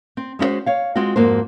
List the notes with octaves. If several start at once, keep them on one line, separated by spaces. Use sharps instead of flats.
C4
G#3 C#4 E4 F#4 C5
C#5 F5
G#3 C4 F4 F#4
F2 G#2 A#3 F#4 C5